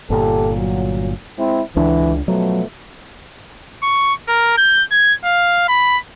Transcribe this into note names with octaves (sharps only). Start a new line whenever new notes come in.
G1 A#2 G4 A4
F#3
G#3 C4 E4
C#2 D3 E3 D4
B2 F3 F#3 A3
C#6
A#4
G6
G#6
F5
B5